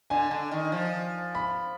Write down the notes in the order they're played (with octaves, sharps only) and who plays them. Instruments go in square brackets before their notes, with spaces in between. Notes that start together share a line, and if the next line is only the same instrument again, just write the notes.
[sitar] D3 [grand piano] G#5
[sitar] D3
D#3
F3
[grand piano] B5